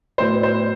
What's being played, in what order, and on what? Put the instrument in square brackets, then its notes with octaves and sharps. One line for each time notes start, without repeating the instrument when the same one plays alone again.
[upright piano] A2 F#3 B3 C5
C5